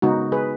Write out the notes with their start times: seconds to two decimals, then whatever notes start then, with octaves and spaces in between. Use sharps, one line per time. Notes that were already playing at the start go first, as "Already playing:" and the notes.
0.02 C#3 G#3 B3 D#4 F#4
0.32 G#4 B4